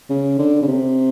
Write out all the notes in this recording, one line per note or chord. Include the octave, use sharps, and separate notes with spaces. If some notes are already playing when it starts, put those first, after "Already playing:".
C#3
D3
C#3
C3